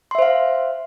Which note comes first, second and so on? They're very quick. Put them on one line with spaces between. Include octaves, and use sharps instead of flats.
C6 E5 C5 F5